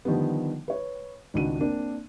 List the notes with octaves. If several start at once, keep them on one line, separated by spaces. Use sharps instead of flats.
D3 D#3 F3 G3 B3
B4 C#5
G#1 C#2 D#3 D4 F#4 D#7
A#3 C4 D4 A#4